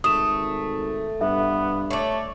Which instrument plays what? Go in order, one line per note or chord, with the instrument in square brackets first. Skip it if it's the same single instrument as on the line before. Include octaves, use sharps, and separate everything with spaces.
[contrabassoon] G#1 [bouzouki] A3 [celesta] D#6 E7
[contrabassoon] G2 [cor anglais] B3 [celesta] E5
[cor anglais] A3 [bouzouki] C#5 D5